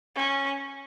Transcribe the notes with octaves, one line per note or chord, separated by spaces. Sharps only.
C#4